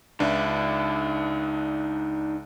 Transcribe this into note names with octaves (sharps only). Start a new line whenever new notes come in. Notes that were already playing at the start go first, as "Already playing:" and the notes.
C#2 D4 D#4 B4 E5